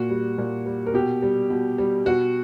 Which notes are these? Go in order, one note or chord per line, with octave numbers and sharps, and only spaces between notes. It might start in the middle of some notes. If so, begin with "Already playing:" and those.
Already playing: A#2 F#4
G3
A#2
G3
A#4
B2 G4
G3
B2
G3
B2 F#4